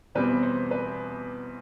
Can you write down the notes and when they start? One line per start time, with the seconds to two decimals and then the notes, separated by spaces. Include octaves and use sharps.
0.15 E2 B2 G3 C4 B4
0.43 C5
0.71 B4